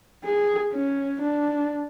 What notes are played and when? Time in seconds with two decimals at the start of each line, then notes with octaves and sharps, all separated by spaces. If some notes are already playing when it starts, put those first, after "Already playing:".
0.25 G#4
0.73 C#4
1.22 D4